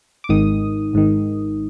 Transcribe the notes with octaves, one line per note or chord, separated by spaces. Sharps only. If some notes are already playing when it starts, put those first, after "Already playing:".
D6
G#1 G#2 D#3 D#6
G#1 G#2 D#3